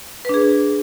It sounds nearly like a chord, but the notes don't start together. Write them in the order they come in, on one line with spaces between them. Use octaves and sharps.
B4 D4 G#4